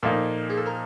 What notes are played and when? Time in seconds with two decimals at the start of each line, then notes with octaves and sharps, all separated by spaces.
0.03 A#2 F3 A#3 D#4 A4
0.49 G#4
0.57 A4
0.66 A#4